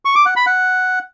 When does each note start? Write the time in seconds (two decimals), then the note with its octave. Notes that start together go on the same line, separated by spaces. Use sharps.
0.05 C#6
0.16 D6
0.26 F#5
0.36 B5
0.46 F#5